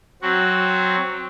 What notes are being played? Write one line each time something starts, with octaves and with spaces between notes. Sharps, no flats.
F#3 C4 F#4